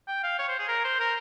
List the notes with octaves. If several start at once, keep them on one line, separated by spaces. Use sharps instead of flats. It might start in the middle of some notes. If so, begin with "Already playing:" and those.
G5
F5
C#5
C5
G#4
A#4
C5
A#4